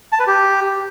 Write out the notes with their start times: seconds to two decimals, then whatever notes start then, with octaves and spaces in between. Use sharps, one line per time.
0.12 A5
0.20 B4
0.27 G4